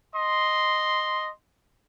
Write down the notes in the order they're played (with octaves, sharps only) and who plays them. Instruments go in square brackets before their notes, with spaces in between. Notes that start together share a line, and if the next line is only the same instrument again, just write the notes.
[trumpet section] D#5 C6